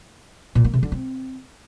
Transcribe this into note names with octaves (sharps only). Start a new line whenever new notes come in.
A#2
A#3
C3
D3
C4